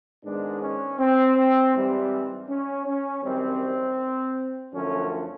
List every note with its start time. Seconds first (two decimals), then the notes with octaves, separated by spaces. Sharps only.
0.24 G#2 D#3 G#3 B3 D4
0.62 C#4
0.99 C4
1.37 C4
1.74 G#2 E3 G3 C4
2.49 C#4
2.86 C#4
3.23 F#2 D#3 G3 C4
4.73 F#2 D3 F3 A3 C#4